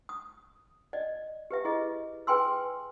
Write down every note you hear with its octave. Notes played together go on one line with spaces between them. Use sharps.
D#6
D5 D#5
G4 B4 E5
E4 G#4 D#5
G#4 B4 G5 G#5 C6 E6